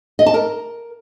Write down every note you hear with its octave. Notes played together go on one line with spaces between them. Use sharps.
D#5
A5
A#4